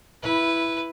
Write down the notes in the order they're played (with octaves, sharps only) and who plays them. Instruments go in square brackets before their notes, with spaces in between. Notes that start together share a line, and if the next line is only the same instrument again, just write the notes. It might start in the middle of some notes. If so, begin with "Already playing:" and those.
[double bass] E4 [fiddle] B4